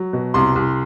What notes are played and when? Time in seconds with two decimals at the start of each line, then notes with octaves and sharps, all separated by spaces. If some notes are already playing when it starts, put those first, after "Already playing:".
Already playing: F#3
0.13 B2
0.34 C2 C6
0.55 C2